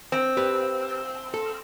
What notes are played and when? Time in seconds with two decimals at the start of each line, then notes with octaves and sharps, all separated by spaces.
0.12 C4
0.37 G4 B4
1.34 A4